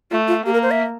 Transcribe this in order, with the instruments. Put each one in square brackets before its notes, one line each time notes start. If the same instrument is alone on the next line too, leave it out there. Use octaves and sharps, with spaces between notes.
[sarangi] A3 [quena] F4
[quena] F4
[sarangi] A#3 [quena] G4
[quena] A#4
C5
E5